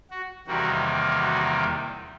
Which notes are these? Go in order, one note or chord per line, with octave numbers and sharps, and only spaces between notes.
F#4
E2 C3 D#3 G3 A#3 F#4
F#4